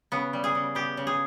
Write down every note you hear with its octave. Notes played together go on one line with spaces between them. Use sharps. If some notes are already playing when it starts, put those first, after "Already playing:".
C#3 B3
G3
G#4
C#3
B3 G4
C#3
G#4